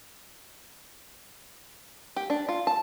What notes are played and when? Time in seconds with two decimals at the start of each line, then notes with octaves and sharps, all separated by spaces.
2.16 G4
2.30 D4
2.49 F4
2.67 A5